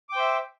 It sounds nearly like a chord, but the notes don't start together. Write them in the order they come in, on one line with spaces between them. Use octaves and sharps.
D6 G5 C5 E5